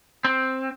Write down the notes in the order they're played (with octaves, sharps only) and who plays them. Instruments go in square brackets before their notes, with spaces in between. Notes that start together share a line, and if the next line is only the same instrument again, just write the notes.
[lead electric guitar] C4